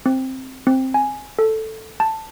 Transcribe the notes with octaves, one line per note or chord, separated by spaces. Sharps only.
C4
C4
G#5
A4
A5